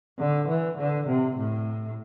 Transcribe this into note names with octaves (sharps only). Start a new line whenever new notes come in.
D3
E3
D3
C3
A2